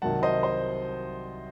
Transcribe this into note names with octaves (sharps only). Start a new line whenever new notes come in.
C2 C3 D#3 F#3 F#5 A5
C5 D#5
C5